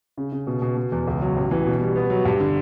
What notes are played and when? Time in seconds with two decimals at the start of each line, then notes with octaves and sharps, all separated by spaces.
0.17 C#3
0.32 C#3
0.47 B2
0.62 B2
0.76 B2
0.92 E2
1.07 C#2
1.22 F#3
1.37 A1
1.51 E3
1.66 B2
1.80 G3
1.96 B3
2.10 F#3
2.25 G2
2.40 D3